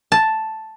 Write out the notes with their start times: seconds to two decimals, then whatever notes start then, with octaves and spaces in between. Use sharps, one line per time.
0.12 A5